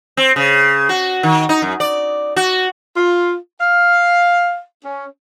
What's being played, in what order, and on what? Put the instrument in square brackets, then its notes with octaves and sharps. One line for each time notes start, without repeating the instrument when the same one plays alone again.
[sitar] C4
C#3
F#4
D#3
D#4
F#2
D5
F#4
[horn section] F4
F5
C#4